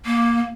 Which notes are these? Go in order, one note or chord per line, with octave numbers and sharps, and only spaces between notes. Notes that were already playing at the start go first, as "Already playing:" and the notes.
A#3